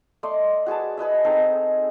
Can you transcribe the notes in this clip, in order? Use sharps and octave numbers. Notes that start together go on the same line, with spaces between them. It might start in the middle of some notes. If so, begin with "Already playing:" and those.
A3 D5 D#5 C6
F#4 G#4 B4 A5
G#4 B4 D#5 E5
C4 D#4 G#4 A4